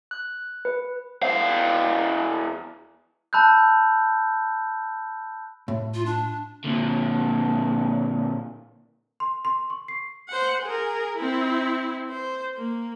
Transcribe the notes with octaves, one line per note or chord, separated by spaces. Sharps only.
F#6
B4
E2 F5
A5 B5 E6 F#6 G6
A2
F4
D4
A#2 D3
C6
C6
C#6
C7
C5 F#5
G#4 A#4
C4 E4
C5
A#3